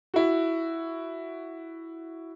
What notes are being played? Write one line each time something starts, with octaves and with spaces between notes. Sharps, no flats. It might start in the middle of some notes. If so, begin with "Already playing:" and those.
E4 F#4